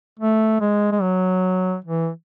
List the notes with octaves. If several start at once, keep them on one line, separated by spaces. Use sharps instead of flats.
A3
G#3
G#3
F#3
E3